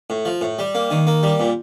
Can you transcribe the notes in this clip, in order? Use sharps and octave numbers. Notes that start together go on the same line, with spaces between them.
A2
F3
A2
G3
A#3
D#3
A#3
G3
A#2